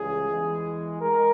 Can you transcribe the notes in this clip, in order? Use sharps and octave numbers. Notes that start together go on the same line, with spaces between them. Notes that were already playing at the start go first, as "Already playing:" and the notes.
Already playing: C#2 C#3 E3 G3 G#4
E2 E3 G#3
G#3 A#4